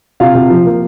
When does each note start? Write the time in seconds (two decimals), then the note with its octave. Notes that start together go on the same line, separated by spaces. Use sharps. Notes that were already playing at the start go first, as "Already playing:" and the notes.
0.20 C3 F4 F5
0.35 C3
0.50 F3
0.66 A#3